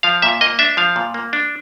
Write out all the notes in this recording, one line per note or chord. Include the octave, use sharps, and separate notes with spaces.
F3 F5
A#2 E5
A#3 D#5
D4 E5
F3 F5
A#2
A#3
D4